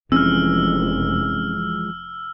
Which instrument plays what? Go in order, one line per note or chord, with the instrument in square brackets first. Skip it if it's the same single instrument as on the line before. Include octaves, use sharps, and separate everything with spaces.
[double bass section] F1 [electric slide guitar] E3 F3 G#3 [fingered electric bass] C4 C#4 [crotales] E6 F6